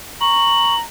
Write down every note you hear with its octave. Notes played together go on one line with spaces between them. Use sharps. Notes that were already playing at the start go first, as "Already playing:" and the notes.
A#5 C#6 F#7